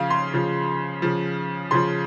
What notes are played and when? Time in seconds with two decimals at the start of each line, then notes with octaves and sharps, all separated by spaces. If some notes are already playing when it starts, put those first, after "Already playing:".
Already playing: C#3 F3 F5
0.10 C6
0.34 C#3 F3
1.02 C#3 F3
1.71 C#3 F3 C6